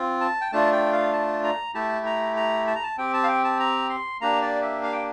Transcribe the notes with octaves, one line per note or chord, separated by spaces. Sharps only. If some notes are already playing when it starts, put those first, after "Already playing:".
Already playing: C4 F4
A5
G5
A3 D4 F4 A5
G5
F5
A5
A#5
A3 E4 G4 A5
A#5
A#5
A5
A#5
A5
C4 G4 G5
A5
F5
G5
A5
A#5
C6
A#3 D4 G4 A#5
D5
E5
F5
G5